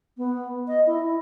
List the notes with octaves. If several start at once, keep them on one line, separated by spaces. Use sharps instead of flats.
B3
D#5
E4